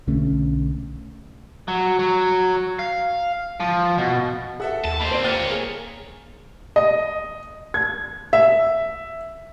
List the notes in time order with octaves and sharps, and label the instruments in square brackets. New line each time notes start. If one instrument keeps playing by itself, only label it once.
[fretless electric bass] B1 D3 A3 C#4
[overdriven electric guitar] F#3
F#3
F5
F3
B2
[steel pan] G#4 E6 [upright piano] A4 E5 F#5
[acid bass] D#2 [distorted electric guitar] A5
[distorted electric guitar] A#3 C5 [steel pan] B5
[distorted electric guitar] C4 E4 [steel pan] C5 D5
[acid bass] A#3 [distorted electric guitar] F4 C#5 [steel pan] G5 [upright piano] F6 A6 D#7
[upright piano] G#4 A#4
D#5
G#6
E5